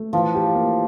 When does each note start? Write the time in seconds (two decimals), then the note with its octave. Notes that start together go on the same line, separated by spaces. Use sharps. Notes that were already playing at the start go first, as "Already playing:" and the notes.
Already playing: A3
0.13 E3 F3
0.35 G4
0.55 A#3